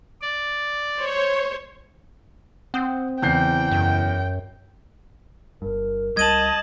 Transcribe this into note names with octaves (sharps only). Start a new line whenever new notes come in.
D5
C5 C#5
C4 F#5 D#6 G6
E2 C#3 E4 G5 G6 C7
F#2
G1 G2 A#4
C#2 G3 D#5 A5 G#6 D#7 F#7